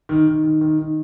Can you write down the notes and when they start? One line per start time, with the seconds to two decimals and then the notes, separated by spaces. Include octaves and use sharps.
0.09 D#3
0.27 D#3
0.44 D#3
0.61 D#3
0.79 D#3